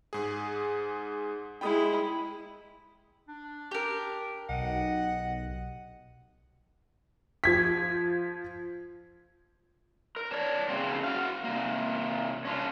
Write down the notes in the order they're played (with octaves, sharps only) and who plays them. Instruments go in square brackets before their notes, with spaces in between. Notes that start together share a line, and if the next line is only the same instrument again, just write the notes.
[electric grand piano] G#2 G#4
[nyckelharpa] G#3 E4 [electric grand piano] G5 B5 D#6
[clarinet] D4
[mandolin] G4 A#4
[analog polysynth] B1 [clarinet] D#5 [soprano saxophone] F#5
[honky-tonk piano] F3 G#6 B6
[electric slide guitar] A#4
D4 C#5 D5
C#3 A#3 C4
F#4 F5
C3 A#3
C#4 D4 F4